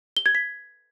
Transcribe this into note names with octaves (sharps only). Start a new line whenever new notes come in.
G7
G#6
B6